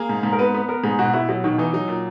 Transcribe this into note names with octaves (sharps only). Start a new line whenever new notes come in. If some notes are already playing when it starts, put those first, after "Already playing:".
Already playing: A#3 G#4
G#2
G#2
A#4
B3 B4
B3 B4
B3 A#4
G#2 G#4
B2 F#4
B2 E4
B2 F#3
B2 D#3
E3 D#4
F#3 D#4
A#2